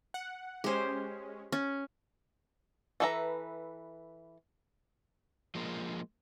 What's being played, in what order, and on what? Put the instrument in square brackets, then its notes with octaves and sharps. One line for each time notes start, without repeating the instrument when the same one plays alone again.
[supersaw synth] F#5
[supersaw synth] G#3 C#4 [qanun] G4 C5
[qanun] C#4
[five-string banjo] E3 A4 B4 E5 A#5
[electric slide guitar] F3 G#3 A#3